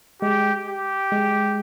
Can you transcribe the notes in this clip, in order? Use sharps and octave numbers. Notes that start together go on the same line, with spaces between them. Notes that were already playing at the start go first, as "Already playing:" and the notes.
G#3 G4
G4
G#3